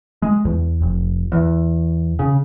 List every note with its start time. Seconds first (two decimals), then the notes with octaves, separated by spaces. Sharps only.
0.22 G#3
0.45 E2
0.82 F1
1.32 E2
2.19 C#3